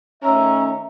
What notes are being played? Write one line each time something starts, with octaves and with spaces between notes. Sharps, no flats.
D#3 A3 C#4 E5 A#5